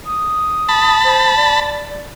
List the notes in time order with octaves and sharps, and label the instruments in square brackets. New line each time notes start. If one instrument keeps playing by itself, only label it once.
[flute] D#6
[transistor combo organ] A5 B5
[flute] C5
D5